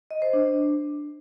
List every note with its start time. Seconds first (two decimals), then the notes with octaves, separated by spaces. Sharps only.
0.11 D#5
0.22 C5
0.33 D4